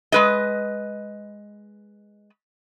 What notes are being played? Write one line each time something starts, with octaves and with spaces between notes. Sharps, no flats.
G#3 B4 D#5